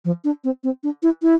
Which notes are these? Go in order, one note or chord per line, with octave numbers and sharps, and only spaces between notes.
F3
D4
C4
C4
D4
E4
E4